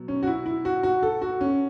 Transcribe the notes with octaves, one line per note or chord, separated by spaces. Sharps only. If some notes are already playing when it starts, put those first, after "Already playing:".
Already playing: B2 F#3
C#4
F#4
E4
E4
F#4
F#4
A4
F#4
C#4